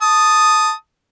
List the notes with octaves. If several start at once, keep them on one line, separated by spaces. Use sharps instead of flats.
A5 D#6